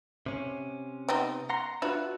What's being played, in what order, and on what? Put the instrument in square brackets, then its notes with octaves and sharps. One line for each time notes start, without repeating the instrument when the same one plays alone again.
[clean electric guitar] C3 C#4
[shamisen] B3 C4 D#4
[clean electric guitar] F#5 A#5 C6
[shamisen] D4 F4 B4 [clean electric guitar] F#4 E5